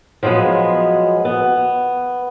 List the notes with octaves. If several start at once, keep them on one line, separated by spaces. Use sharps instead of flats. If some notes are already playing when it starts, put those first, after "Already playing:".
F3 F#3 G#3 B3 G#4
B3